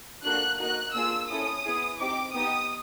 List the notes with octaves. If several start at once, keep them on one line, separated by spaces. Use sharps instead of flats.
A#3 D4 F#4 A4 F#6
A#3 D#4 F#4 F#6
A#3 D4 F4 G#4 E6
C#4 E4 A4 D#6
B3 E4 G#4
C4 D#4 G4 D6
B3 D#4 G4 D#6